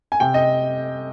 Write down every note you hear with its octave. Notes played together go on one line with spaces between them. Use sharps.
G#5
C3 G5
D#5